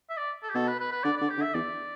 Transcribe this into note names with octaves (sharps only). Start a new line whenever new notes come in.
E5
D5
A4
G4
B2 A4
B4
B4
B4
D3 D5
D3 D5
G4
D3
E5
E2 D5